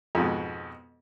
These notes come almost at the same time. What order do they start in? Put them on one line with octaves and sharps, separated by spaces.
F2 G#2 B2